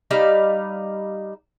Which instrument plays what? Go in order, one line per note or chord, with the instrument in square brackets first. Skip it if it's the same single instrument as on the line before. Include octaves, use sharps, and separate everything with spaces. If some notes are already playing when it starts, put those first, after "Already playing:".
[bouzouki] G3 D#4 F5